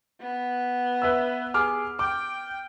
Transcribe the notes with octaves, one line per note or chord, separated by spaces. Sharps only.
B3
B4 E5 E6
G#4 D6 F6
G5 D6